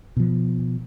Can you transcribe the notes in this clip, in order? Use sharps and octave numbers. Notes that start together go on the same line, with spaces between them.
B2 F3